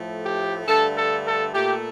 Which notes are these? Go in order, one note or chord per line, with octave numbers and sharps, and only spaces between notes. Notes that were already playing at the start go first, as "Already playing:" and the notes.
Already playing: A2 F3 A3
G4
G2 D3 A3 A4
A4
A4
A#2 A3 G4